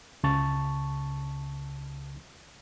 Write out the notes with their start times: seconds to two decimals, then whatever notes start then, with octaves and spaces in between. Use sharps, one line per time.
0.23 C#2 C#3 A5 C#6 A6